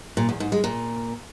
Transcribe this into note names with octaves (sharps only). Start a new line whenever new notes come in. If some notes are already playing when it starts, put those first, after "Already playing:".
A#2
E2
G#2
G#3
A#2